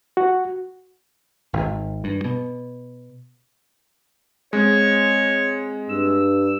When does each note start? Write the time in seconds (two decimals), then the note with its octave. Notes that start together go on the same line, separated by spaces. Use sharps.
0.17 F#4
1.53 G#1
2.04 G2
2.25 B2
4.53 G#3 C4 C#5 D#5
5.89 G2 E6